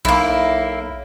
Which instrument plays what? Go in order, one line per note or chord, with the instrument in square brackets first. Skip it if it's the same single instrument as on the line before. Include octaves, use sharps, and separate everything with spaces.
[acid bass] B1 [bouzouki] A#3 E4